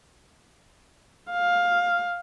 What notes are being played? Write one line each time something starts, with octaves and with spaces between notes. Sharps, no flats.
F5